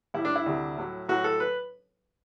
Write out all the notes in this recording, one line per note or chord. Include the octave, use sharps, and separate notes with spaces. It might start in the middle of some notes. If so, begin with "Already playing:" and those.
A2 G3 E4
D4
E4
D2 C3 G3
A2 F#3
A2 F#3 F#4
A4
B4